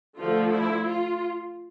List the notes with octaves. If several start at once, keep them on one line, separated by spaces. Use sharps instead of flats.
D3 F3 A3 F4
E4
F4